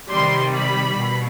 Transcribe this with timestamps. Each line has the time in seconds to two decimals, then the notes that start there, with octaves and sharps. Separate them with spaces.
0.10 C3 D#3 G3 C6
0.54 B5
0.96 B2